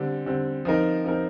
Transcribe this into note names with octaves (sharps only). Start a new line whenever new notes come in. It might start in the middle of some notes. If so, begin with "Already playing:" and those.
Already playing: D3 G3 C4
D3 G3 C4
F3 C4 D#4 A#4
F3 C4 D#4 A#4